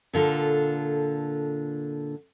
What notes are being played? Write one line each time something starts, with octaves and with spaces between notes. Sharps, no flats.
A#2 D3 F4 A4